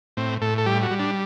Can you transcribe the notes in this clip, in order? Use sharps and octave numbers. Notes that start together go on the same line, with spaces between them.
A2 C4
A2 A4
A4
G3 G4
F#4
G3
D4